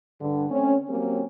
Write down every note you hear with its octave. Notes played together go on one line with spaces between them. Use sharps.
G2 D3
A3 C4 C#4
F#3 A#3 C4 C#4 G4